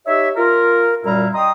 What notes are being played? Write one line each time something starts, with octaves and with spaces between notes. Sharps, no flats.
D#4 G4 C#5 E5
F4 A#4
F#2 A#2 G3 E4 F5 A#5
D#5 G5 A#5 C6 D#6